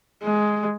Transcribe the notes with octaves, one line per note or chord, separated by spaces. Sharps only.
G#3